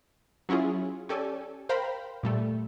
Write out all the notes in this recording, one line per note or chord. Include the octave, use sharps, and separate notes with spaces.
F#3 C#4 E4 F4 G#4
C#4 G4 A4 D5 G#5
A#4 C5 F5 G5 A#5 B5
A#2 G3 A3